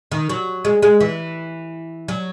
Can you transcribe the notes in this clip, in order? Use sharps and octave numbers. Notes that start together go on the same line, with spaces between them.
D#3
F#3
G#3
G#3
E3
F#3